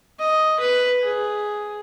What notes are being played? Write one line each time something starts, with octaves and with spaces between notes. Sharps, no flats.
D#5
B4
G#4